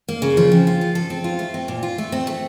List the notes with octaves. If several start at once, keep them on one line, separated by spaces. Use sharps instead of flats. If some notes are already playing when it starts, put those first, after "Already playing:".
A#3
C#3
F3
C4
F4
F3
A4
C4
F4
A3
C4
A#2
F4
A3
C4
A3